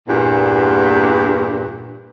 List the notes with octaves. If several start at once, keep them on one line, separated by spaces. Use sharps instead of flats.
E2 G2 A#2